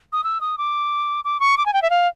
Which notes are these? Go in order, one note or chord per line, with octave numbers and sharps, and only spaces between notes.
D#6
E6
D#6
D6
D6
C#6
D6
G#5
G5
E5
F5